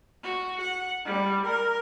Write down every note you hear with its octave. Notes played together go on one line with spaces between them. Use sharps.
F#4
F#5
G3
A#4